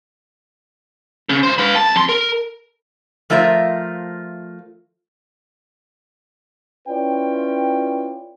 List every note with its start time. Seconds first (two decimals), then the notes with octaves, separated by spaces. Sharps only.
1.29 C#3
1.43 D#3 C5
1.58 B4 F5
1.76 C#2 A5
1.95 F2 C6
2.09 A#4
3.30 F3 A3 F4 A#4 C5 E5
6.88 C#4 E4 F4 B4 D5 G5